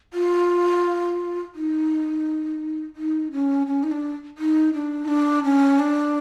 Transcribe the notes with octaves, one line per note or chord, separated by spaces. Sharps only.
F4
D#4
D#4
C#4
C#4
D#4
D4
D#4
D4
D#4
D4
C#4
D4